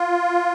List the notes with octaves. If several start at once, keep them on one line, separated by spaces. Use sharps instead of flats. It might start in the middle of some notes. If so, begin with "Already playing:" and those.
Already playing: F4